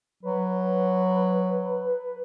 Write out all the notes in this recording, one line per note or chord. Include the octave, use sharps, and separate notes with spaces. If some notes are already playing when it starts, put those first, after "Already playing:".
F#3 B4